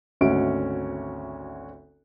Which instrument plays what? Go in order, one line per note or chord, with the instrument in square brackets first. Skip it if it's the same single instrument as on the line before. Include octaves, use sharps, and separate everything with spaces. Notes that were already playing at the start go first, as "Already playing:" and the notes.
[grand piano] G#1 D2 C#4 F#4 E5 D7